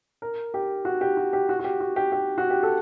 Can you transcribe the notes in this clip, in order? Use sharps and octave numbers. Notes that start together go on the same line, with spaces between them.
A#4
G4
F#4
G4
F#4
G4
F#4
F#4
G4
F#4
G4
G4
F#4
G4
A4